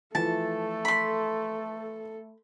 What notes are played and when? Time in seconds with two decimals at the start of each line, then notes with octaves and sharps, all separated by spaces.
0.15 E3 F3 A3 A4 A5
0.85 B5 C6